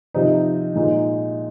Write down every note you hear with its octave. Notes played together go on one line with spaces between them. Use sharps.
C3 F3 C4 D#4
A#2 G#3 D#4